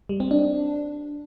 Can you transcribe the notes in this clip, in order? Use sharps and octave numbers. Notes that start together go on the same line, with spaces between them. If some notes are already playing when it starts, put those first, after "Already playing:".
G3
C4
D4